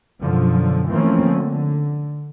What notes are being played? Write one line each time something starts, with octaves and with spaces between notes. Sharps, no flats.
F#2 B2 D3 F3 F#3
E3 F3 A3 A#3 C4 C#4
D3